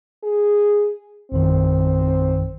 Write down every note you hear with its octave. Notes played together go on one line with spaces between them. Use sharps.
G#4
A#1 F#2 D#3 C4